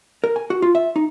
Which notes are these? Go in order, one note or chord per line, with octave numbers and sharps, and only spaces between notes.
A#4
G#5
F#4
F4
E5
D#4